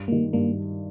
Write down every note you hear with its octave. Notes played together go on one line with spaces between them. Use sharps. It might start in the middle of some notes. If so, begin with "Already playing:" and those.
Already playing: G2
D#3 G3 A#3
G2 A#3